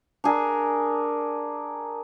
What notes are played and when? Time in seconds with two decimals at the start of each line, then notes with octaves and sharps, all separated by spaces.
0.24 D4 G#4 A#4